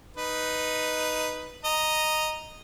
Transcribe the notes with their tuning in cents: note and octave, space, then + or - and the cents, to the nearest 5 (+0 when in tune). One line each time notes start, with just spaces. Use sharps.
D#4 +0 B4 +0
D#5 -5 A#5 +0